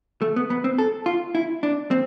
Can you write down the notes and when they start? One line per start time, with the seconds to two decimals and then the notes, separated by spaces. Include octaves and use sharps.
0.22 A3
0.36 B3
0.50 B3
0.64 C4
0.78 A4
1.06 F4
1.35 E4
1.63 D4
1.91 C4